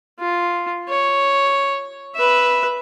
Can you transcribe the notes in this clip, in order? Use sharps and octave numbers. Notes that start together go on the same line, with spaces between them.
F4
C#5
B4 E5